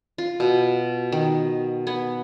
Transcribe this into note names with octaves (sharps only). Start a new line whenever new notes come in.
F4
B2
D#3
B3